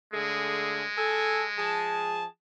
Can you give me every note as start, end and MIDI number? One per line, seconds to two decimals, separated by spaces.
0.13 0.84 50
0.13 2.22 56
0.13 0.84 57
0.13 0.84 68
0.97 1.44 69
0.97 1.44 80
1.58 2.25 53
1.58 2.25 68
1.58 2.25 81